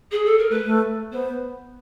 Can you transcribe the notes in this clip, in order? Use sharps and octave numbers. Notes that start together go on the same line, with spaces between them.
G#4
A4
A#4
A3 B4
A3
B3 C5